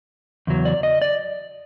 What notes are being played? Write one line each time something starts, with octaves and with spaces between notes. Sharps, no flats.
E2 C#3 F#3
D5
D#5
D5